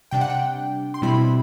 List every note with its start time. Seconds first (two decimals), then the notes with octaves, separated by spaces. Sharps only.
0.11 C3 G3 D4 G5
0.21 F#5
0.30 G5
0.94 C6
1.02 B2 G3 C4 E4 B5